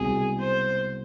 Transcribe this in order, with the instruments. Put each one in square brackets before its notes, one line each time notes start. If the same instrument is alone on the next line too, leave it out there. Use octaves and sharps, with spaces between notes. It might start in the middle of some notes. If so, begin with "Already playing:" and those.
Already playing: [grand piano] C2 B2 G#3 [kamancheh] G#4
[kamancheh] C5